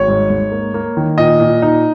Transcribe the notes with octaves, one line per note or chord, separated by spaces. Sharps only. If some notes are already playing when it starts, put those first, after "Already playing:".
Already playing: G#1 C#5
G#2
G#2
A#3
A#3
D#3
A#2 D#5
A#2
D#4